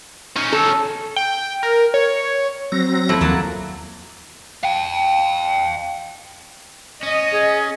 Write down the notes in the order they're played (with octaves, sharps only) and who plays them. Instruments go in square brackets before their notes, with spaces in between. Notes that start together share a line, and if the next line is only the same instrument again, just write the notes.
[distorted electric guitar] C#4 D#4
[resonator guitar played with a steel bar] A4
[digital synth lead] G5
A#4
C#5
[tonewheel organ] F#3 C4 A#6
[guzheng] F2 A3 E4
[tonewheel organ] D#2 [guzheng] F#3 A#3 A5
[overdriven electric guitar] F5 G5
[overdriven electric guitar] C#4 [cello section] D#5
[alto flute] G#4